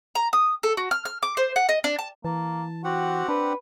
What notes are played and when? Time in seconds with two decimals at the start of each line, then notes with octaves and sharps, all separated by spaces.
0.15 A#5
0.33 D#6
0.63 A4
0.77 F#4
0.91 F6
1.05 F6
1.23 D6
1.37 C5
1.56 F#5
1.69 D#5
1.84 D4
1.99 A5
2.25 E3 A#3 A5
2.84 C4 F#4 G4 F#5
3.29 D4 B4